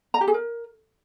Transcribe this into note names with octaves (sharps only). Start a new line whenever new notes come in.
A#5
G4
G#4
A#4